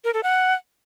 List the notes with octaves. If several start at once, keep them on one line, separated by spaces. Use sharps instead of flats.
A#4
A4
F#5